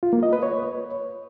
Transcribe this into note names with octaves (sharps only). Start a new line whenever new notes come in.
F4
A#3
D#5
B4
C#5